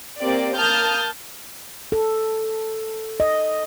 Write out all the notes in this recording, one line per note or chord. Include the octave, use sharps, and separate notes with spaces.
A#3 C4 G4 D5
A#3 A5 D#6 F6 G6
A4
D#5